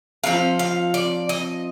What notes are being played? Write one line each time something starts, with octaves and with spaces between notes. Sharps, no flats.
F3 C4 D#4 F5
F5
D5
D#5